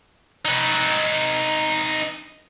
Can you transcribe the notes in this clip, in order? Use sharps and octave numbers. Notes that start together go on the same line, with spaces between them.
D#4 B4